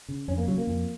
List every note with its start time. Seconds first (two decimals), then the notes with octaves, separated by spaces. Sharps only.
0.09 C#3
0.28 F2 C#4
0.38 A#3
0.47 C#3 F#3
0.58 A#3
0.67 F2